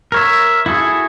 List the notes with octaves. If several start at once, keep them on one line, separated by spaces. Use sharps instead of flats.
A#4 C#5 E5
E4 F#4 G#4 A4